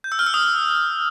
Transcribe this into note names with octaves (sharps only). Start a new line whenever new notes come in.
G6
E6
F6
E6
D#6